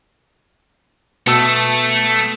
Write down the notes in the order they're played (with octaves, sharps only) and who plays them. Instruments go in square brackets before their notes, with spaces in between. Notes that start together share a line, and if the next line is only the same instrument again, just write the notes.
[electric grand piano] B2 A5 E6 [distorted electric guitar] A3